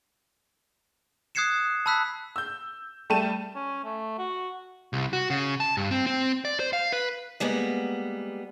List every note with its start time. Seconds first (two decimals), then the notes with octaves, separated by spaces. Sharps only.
1.35 D#6 F#6 G#6 C7 C#7 E7
1.86 A5 B5 E6 F#6 B6
2.36 E6 G6
3.10 G3 A3 A5 D#7 E7
3.55 C#4
3.84 A3
4.18 F#4
4.93 C2
5.13 F#4
5.30 C#3
5.60 A5
5.77 G2
5.91 C4
6.06 C4
6.45 D5
6.60 C5
6.73 F5
6.92 B4
7.40 G3 G#3 A#3 B3